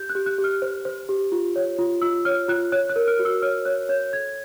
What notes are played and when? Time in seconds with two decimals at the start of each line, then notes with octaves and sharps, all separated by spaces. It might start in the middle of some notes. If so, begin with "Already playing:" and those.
Already playing: G4 G6
0.10 F#6
0.15 G4
0.26 F#6
0.38 G4
0.44 F6
0.62 C5
0.85 C5
1.09 G4
1.32 F4
1.56 C#5
1.79 F4
2.02 F4 E6
2.25 C#5 F6
2.48 F4 F#6
2.72 C#5 F#6
2.89 F#6
2.96 A#4
3.08 F6
3.19 F#4
3.25 E6
3.42 C#5 F6
3.65 C#5 F#6
3.89 C#5 G6
4.13 A4 G#6